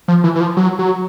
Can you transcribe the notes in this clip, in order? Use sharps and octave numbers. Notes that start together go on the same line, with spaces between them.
F3
E3
E3
F3
F#3
F#3